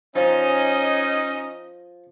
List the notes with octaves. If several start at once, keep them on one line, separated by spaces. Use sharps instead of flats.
F3 C#4 D#4 D#5